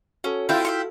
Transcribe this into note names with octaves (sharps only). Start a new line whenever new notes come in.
C#4 F#4 A4
C4 E4 F4 G5
E5 G5 C#6